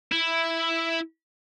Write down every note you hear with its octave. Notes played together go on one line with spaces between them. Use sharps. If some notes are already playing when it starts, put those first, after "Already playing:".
E4